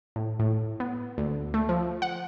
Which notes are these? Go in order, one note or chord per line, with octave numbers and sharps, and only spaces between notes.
A2
A2
B3
D2
A3
F3
F#5